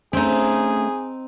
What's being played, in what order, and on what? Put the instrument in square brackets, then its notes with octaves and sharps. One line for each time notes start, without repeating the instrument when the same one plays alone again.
[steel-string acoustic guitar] A3 C#4 [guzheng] C4 D#4 [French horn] G#4